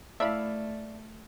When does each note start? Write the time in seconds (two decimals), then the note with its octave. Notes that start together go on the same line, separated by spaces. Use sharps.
0.20 A3 E4 D5 E5 F5 A5 B5